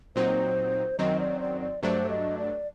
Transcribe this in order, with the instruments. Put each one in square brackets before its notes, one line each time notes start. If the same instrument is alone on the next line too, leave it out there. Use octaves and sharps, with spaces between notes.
[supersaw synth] A#2 F#3 C4 D#4 [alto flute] C5
[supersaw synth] F#2 D#3 F#3 C4 [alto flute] D#5
[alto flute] D5
D5
D5
[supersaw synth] G2 F#3 A3 D4 [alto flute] C5
[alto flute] D#5
D5